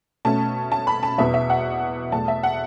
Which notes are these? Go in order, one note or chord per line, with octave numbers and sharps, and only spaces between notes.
B2 A3 C#4 A5
A5
B5
A5
E2 B2 B3 E5
E5
F#5
E2 B2 A3 A5
E5
F#5